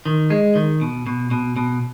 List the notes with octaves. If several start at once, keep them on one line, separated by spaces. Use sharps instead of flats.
D#3
G#3
D#3
B2
B2
B2
B2